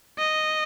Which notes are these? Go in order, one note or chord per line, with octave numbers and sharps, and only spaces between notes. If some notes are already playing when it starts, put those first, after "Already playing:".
D#5